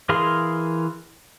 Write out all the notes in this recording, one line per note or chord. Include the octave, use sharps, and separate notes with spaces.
E3 G#4 A#4 F5 C6